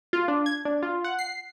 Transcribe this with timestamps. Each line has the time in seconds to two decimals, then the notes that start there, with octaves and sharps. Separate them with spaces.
0.13 F4
0.28 D4
0.46 G#6
0.65 D4
0.83 F4
1.04 F#5
1.19 C7